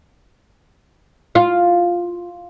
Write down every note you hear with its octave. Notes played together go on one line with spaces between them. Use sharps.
F4